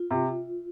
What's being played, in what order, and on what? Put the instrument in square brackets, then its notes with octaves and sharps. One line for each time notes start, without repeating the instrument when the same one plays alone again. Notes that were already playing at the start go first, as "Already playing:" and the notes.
Already playing: [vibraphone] F4
[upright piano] C3